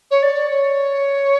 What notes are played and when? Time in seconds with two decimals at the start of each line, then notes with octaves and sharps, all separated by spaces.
0.11 C#5
0.22 D5
0.50 C#5